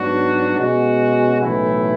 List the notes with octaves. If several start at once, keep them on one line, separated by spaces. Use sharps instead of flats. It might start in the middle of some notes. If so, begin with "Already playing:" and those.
Already playing: G#2 F#3 B3 D4 F#4
B2 G#3 C#4 F#4
B1 A2 E3 A3 E4